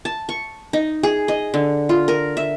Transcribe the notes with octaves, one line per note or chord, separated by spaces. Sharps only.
A5
C#6
D#4
G#4
D#5
D3
F4
A#4
E5